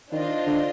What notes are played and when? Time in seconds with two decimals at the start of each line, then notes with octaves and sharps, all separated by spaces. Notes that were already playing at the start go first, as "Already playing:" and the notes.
0.11 D#3 D4 F4 C5 D#5
0.47 D3